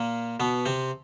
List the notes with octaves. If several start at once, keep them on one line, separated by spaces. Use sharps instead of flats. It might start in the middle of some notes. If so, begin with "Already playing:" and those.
Already playing: A#2 A#3
B2 B3
C3 C4